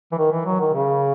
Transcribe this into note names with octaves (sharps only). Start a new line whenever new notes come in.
E3
D#3
E3
F#3
D#3
C#3